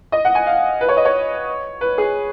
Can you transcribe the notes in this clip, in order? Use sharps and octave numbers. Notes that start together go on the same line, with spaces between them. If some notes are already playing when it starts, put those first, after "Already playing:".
D#5
F#5
G#5
F5
B4
C#5
D#5
C#5
B4
G#4